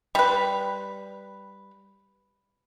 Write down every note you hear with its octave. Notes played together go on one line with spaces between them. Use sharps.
G3 B4